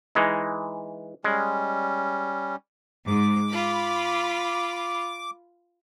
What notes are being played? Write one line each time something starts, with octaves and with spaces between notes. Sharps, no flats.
E3 G#3 D#4
G3 G#3 C#4
G#2 G#3 D6
F4 B5